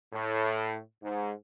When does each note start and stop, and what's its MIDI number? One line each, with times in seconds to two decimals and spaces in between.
0.13 0.79 45
1.02 1.30 44